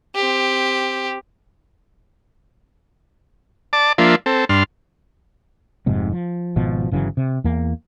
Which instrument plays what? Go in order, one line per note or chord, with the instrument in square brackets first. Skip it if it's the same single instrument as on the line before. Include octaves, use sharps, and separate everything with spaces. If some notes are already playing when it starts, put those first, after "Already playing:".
[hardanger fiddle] C4 G4
[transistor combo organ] D5 A5 D6
F3 A#3 D4 F4 E5
C4 A4
G2 D4 C6 F6
[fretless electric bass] F1 G#2 C3
F3
G#1 B2 F3
G1 C#3 E3 F#3
C3
E2 A#3